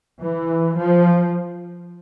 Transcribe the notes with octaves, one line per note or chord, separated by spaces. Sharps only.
E3
F3